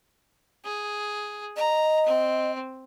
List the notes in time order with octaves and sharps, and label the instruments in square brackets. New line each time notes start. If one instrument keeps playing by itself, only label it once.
[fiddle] G#4
[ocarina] D#5 [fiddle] A#5
[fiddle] C4